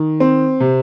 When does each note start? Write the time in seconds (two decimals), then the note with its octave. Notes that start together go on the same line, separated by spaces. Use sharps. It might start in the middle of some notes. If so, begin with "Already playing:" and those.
Already playing: D#3
0.20 C4
0.60 C3